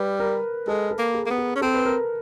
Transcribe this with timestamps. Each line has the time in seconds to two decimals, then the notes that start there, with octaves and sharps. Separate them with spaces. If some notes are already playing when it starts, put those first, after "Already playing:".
Already playing: G3 B4
0.20 A#4
0.68 G#3 A4
0.91 A4
0.98 A#3
1.14 G#4
1.26 A#3
1.31 B3
1.38 G#4
1.56 C#4
1.61 C4 A4
1.74 B4
1.85 A#4